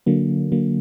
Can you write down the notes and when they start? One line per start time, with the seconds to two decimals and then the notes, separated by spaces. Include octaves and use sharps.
0.06 D3 F#3 A#3
0.52 D3 F#3 A#3